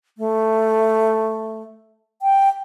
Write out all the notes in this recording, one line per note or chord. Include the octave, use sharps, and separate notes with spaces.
A3
G5